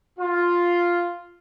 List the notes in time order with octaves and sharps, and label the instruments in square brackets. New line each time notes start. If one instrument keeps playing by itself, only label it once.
[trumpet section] F4